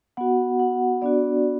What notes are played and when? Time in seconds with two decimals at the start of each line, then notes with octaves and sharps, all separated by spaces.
0.17 B3 F#4 F#5
0.59 F#5
1.02 B3 D4 F#4 D5